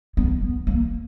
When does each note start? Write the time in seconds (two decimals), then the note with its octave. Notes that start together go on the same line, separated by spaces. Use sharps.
0.17 B3
0.42 B3
0.67 A#3